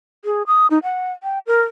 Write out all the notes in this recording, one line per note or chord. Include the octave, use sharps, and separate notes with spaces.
G#4
D#6
D#4
F#5
G5
A#4